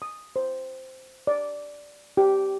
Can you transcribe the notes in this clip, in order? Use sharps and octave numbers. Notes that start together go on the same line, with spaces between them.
D#6
C5
D5
G4